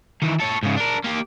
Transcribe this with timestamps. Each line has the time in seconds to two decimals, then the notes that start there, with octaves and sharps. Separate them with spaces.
0.22 D#3 E3
0.40 A4 C#5
0.63 G#2 C#3
0.77 D4 A#4
1.04 A#3 G4